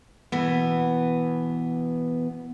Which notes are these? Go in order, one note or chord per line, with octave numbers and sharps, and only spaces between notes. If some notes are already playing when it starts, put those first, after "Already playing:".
B2 E3 B3